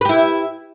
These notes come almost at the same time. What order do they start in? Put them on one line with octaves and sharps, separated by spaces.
B4 G4 E4